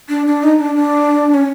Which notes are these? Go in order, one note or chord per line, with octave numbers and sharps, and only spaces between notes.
D4
D4
D#4
D4
D4
C#4